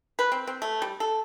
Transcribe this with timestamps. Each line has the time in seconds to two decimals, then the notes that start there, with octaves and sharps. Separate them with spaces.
0.19 B4
0.32 C4
0.47 C4
0.62 A3
0.82 G3
1.00 A4